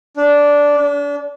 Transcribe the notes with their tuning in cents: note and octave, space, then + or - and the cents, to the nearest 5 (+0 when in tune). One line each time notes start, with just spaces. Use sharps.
D4 -10
D4 -35